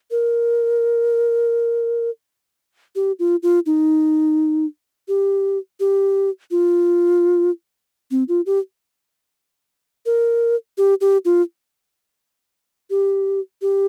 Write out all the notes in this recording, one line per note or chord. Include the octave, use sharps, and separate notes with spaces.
A#4
G4
F4
F4
D#4
G4
G4
F4
C4
F4
G4
A#4
G4
G4
F4
G4
G4